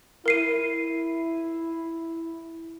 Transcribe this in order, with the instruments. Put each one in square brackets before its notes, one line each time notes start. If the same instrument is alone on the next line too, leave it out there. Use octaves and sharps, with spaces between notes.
[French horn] E4 [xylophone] A#4 C7 D#7